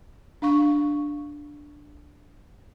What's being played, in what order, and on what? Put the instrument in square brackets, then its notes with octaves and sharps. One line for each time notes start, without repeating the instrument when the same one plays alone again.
[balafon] D4 F5 C#6